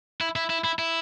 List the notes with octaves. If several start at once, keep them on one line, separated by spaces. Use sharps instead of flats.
E4
E4
E4
E4
E4